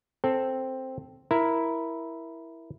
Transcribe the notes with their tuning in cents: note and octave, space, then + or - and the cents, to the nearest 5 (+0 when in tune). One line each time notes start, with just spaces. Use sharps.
C4 +0 A4 +0
E4 +0 A#4 +10